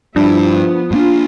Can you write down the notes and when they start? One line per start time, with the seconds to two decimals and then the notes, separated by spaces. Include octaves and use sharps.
0.16 G2 F3 G3 D4 E4
0.53 B3
0.91 G2 A#3 D4 F4